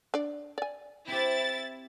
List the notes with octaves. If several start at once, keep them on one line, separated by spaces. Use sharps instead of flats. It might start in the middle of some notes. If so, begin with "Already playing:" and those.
D4 D5
D5 G#5
C4 E4 G4 A6